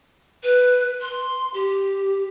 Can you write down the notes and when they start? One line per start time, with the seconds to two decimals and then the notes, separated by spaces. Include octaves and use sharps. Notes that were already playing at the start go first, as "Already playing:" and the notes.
0.43 B4
1.01 C6
1.54 G4